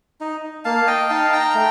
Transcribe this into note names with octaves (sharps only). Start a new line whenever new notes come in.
D#4
A#3 F5 A5
D#5 G5
D#4 F5 A5
G5 A#5
A3